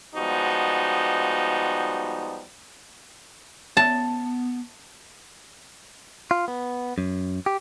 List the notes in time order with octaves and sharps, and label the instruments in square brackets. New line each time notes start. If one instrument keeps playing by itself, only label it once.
[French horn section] F3 G3 G#3 B3 D#4 F#4
[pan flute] B3 [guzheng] A5
[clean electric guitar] F4
B3
F#2
G4